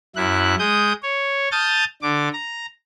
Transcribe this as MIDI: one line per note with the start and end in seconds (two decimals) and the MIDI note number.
0.16 0.55 42
0.16 0.55 64
0.16 0.55 90
0.59 0.93 56
0.59 0.93 87
0.59 0.93 91
1.03 1.49 73
1.52 1.84 81
1.52 1.84 87
1.52 1.84 89
1.52 1.84 91
1.52 1.84 93
2.02 2.29 50
2.02 2.29 86
2.33 2.66 82